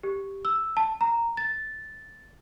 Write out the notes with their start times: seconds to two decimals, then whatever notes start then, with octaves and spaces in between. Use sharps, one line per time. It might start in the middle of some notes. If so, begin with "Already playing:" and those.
0.03 G4
0.45 E6
0.77 A5
1.01 A#5
1.37 A6